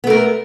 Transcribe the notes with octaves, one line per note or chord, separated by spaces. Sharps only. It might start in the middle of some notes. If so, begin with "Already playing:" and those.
A3 B3 A#4